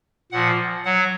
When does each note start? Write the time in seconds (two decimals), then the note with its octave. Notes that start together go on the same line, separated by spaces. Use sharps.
0.32 A#2 F3 F#5
0.85 F#3 F#5